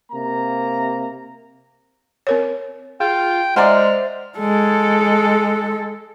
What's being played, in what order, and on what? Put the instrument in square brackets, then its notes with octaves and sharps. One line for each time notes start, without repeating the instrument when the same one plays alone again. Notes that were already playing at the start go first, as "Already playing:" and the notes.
[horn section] C3 A#3 A#5
[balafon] C4 A#4 C#5
[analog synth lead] F4 [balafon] G#4 [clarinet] G5
[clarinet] G#3 [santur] C5 D5 E5 [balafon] F#5 G#5 A#5 [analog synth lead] F6
[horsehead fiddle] G#3 A4